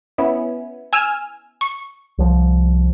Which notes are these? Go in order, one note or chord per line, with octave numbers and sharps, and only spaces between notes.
B3 C#4 E4
G#5 E6 F6
C#6
C2 F3